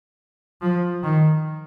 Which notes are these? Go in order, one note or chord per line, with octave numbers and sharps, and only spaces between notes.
F3
D#3